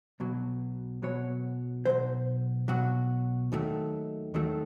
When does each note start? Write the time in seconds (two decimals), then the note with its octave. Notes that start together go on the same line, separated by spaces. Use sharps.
0.20 B1 B2 F#3
1.02 B1 B2 F#3 C#5
1.85 B2 F#3 C5
1.90 B1
2.68 B1 B2 F#3 F#4
3.52 D#2 D#3 F#3 A3
4.34 D#2 D#3 F#3 A3